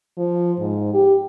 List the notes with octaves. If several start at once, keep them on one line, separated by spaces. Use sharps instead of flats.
F3
G#2
G4